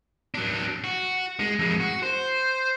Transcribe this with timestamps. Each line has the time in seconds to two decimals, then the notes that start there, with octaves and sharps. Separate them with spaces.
0.34 F#3 D4
0.84 F#4
1.40 G#3
1.59 F2 G#3
1.80 F#4
2.03 C5